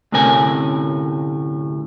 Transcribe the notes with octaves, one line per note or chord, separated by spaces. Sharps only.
D2 A2 C3 C#4 A#4 G#5